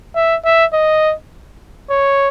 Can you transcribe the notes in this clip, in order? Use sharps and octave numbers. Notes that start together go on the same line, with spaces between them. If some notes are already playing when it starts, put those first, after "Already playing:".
E5
E5
D#5
C#5